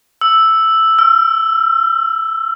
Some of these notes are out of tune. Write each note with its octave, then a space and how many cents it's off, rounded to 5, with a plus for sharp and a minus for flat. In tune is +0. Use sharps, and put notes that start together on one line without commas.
E6 +0
E6 +45